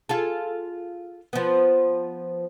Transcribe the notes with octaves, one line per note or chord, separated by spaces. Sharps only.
F4 G#4 A4
F3 B3